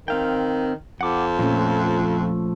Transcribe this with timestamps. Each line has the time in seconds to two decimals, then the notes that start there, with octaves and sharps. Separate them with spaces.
0.08 D#3 C4 F5 G5
1.01 F2 F#5 D6
1.39 A#2 F3 A3 C#4